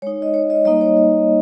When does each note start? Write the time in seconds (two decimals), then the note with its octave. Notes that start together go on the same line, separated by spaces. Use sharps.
0.02 G#3 D#4 C#5
0.22 D#5
0.34 C#5
0.50 D#5
0.65 G3 A#3 D#4 D#5
0.81 C#5
0.97 D#5